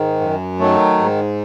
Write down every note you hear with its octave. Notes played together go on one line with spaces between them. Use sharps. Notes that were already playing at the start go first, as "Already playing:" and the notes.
Already playing: G#2 D#3
F#2
D#3 F#3 A3
G#2